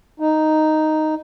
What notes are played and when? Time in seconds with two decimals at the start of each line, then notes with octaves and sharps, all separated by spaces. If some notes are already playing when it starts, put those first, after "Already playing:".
0.20 D#4